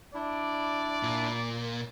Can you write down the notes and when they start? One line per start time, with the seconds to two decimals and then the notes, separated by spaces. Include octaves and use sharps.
0.14 D4 E4 D5
1.03 A#2